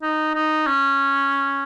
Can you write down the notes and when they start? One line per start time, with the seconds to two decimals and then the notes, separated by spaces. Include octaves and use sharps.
0.03 D#4
0.35 D#4
0.67 C#4